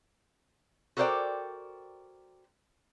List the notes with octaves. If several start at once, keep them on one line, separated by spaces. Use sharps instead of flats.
F#4 A4 A#4 C5 D5 G5